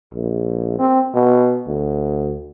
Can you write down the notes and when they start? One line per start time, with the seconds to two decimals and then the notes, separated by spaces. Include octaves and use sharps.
0.13 A#1
0.79 C4
1.14 B2
1.67 D2